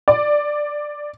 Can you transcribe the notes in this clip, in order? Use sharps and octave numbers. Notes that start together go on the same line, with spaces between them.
D5